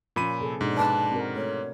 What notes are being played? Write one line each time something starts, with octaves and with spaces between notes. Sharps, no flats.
A#2 F3 A#3 C#4 B5 D#7
C3 G#4 A4
G#2 B2 D4
D4 B4 D5 A5
C4 F#4 A#4
A3 C#5